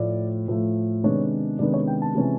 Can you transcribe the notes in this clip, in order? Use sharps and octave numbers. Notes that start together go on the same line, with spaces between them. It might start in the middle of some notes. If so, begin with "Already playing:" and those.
Already playing: A2 F3 A3 D5
A2 F3 A3
C3 D#3 G#3 B3 D4 C#5
C3 D#3 G#3 B3 D4 D5
C#5
G5
A5
C3 E3 G#3 C#4